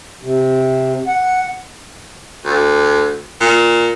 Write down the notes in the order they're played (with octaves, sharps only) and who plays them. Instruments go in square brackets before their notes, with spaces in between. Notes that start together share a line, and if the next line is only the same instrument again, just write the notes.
[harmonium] C3
F#5
[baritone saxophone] D2
A#2